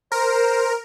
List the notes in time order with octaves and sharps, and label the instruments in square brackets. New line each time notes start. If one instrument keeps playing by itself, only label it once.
[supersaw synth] A#4 [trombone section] C5